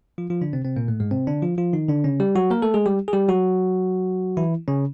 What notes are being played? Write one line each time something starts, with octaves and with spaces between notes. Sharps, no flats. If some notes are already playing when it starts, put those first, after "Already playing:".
F3 F4
F3 F4
D3 D4
C3 C4
C3 C4
A#2 A#3
A2 A3
G#2 G#3
C3 C4
D3 D4
F3 F4
F3 F4
D#3 D#4
D3 D4
C#3 C#4
G3 G4
F#3 F#4
A#3 A#4
A3 A4
G#3 G#4
G3 G4
G#4
G3 G4
F#3 F#4
E3 E4
C#3 C#4